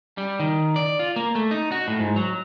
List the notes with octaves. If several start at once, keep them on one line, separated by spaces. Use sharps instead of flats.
G3
D#3
D5
F4
A#3
A3
D#4
F#4
A2
G#2
F#3